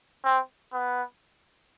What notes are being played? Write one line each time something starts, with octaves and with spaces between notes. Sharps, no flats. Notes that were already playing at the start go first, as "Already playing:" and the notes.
C4
B3